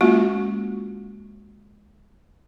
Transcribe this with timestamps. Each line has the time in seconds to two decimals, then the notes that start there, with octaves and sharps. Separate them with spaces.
0.01 G#3 A#3 C#4 F4 F#4